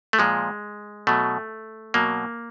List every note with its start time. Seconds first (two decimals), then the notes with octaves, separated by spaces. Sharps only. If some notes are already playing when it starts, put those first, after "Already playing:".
0.13 A3
0.19 A#2 F3 G#3
1.07 B2 F#3 A3
1.94 B2 F#3 A#3